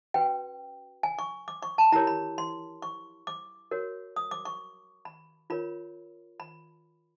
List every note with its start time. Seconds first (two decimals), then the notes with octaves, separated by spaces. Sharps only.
0.14 C#4 F#4 B4 G5
1.03 G#5
1.19 C#6
1.48 D6
1.63 C#6
1.78 A5
1.92 E4 G4 A#4 C#5 A#5
2.07 B5
2.38 C6
2.82 C#6
3.27 D6
3.71 F#4 A#4 C#5
4.16 D#6
4.31 D6
4.45 C#6
5.05 B5
5.50 F4 A#4 C#5 B5
6.40 B5